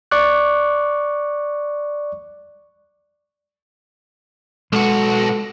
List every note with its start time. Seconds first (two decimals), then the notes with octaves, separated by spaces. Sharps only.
0.11 D5 C#6 D6 F#6
4.73 B1 G#3 F#4 A4